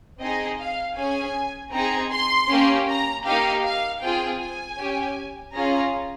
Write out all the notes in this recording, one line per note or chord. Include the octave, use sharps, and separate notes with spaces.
C4 D#4 G#4 D#5
F5
C#4 G#4 G#5
C4 D#4 G#4 A#5
C6
A#3 C#4 G4
A#5
A#3 D#4 G4 F5
F5
C4 F4 G#4 G5
G#5
C#4 G4
C#4 F4 G#4 A#5